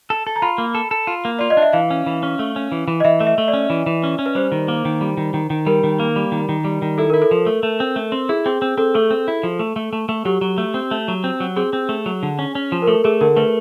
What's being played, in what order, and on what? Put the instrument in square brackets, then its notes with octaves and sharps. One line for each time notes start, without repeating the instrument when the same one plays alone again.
[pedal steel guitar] A4
A4
[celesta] A#5
[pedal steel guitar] F4 [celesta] B5
[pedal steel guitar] A#3
A4
A4
F4
A#3
[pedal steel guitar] F4 [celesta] D5
[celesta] D#5
[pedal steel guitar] D4
[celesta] E5
[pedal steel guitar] E3 [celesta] F5
[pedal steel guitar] C#4
E3
C#4
A3
C#4
E3
E3
[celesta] D#5
[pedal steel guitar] E3 [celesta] E5
[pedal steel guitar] A3
[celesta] E5
[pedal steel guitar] A3
[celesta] D5
[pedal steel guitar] C#4
E3
E3
C#4
C#4
[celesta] B4
[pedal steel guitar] G3 [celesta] C5
[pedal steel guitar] D#3
A#3
D#3
G3
D#3
D#3
D#3
[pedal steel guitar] G3 [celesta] A#4
[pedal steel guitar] D#3
A#3
G3
D#3
D#3
G3
D#3
[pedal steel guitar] E4 [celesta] A4
[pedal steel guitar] E4 [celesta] A#4
[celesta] A4
[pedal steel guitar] F3
A3
A3
C4
A3
C4
[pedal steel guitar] E4 [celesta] G#4
[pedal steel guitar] C4 [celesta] G#4
[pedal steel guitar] C4
[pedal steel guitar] C4 [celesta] A4
[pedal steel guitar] A3 [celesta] A4
[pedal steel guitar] C4
E4
F3
A3
A3
A3
A3
[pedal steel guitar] F#3 [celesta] G4
[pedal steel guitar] F#3
A3
C4
A3
F#3
C4
F#3
[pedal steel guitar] C4 [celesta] G#4
[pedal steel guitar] C4
A3
F#3
D3
C#4
C#4
F3
[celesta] A#4
[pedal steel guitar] A3 [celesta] A4
[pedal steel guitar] A3 [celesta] G#4
[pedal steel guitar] D3 [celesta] A#4
[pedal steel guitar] A3 [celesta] B4